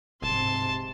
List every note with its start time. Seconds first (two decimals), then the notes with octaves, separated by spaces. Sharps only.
0.22 D1 G#2 C3 A5 C6